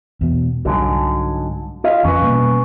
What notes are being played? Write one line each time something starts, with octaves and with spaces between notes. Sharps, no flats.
E2 B2
C2 G#2 D3 F#3
F4 D#5 F5
F2 F3 C#4 B4
B2 G3 A#3